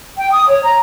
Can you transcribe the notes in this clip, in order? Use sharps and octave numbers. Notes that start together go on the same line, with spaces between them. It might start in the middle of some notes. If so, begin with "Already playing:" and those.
G5
D#6
C#5
A#5